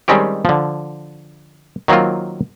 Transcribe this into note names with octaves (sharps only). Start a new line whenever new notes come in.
D#3 G3 G#3 C4 C#4 G4
D3 F3
D#3 F#3 A#3 C4 F4